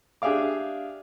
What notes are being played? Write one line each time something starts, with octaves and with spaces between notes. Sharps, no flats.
D4 G4 G#4 E5 F5 D6